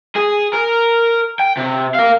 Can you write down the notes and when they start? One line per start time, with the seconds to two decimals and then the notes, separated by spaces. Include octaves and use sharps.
0.16 G#4
0.54 A#4
1.39 G5
1.57 C3
1.94 A#4 F5